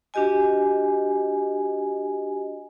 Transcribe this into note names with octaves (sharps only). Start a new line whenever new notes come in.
D4 F#4 G4 D#5 G#5